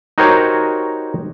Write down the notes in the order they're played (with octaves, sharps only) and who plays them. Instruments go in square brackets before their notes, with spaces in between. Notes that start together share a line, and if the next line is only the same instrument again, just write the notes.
[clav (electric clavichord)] D#4 F#4 G4 A#4 C5 C#5